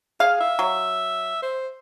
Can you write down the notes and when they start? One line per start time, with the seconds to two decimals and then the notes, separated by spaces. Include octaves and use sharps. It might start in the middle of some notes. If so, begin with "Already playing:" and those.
0.20 G#4 F5
0.40 E5
0.59 F#3
1.42 C5